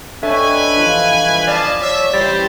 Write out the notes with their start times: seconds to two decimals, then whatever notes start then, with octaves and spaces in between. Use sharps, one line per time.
0.23 D4 A4 B4 C#5 D#5 E5 G5 G#5
0.78 E2 G2 E3 F3
1.47 D5 D#5 F5 A5
1.82 C#5 E5
2.14 C#3 E3 G3 E4 G4 C5 A6